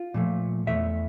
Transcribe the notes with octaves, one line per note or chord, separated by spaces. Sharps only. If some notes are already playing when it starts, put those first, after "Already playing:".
Already playing: F4
A#2 F3 A3
E2 E3 A3 E5